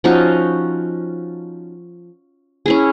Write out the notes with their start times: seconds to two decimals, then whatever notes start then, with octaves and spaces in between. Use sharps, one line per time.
0.04 F3 C#4 D#4 F#4
2.66 C#4 E4 G#4